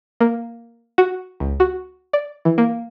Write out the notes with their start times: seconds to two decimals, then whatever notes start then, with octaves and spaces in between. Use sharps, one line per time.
0.21 A#3
0.98 F#4
1.40 C#2
1.60 F#4
2.13 D5
2.45 E3
2.58 A#3